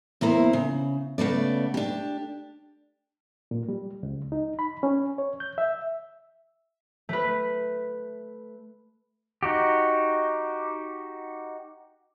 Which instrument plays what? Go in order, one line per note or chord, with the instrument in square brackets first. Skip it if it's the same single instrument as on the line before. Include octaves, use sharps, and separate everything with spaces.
[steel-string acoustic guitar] E2 A#3 E4 C5
C#3
C#3 A3 B3 D5
D4 G4
[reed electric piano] A#2
G3
C#2
D#4
B5
C#4
C#5
G6
E5
[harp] A3 B4
[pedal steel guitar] D#4 F#4 G4